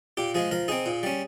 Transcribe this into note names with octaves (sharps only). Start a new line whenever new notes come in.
A#2 G4
F3 G#3 G#4
F3 A#4
C4 D#4 G#4
A#2
G3 C#4